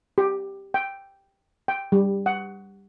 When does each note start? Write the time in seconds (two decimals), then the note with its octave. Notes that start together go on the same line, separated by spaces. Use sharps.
0.18 G4
0.74 G5
1.68 G5
1.92 G3
2.26 F#5